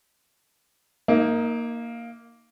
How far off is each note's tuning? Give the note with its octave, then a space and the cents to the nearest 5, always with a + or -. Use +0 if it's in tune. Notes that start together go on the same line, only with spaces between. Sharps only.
A#3 +0 D#4 +0 D#5 +45